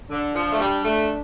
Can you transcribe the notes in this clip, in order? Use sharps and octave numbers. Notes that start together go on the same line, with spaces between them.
D3 D4
F3
A3
G3
A3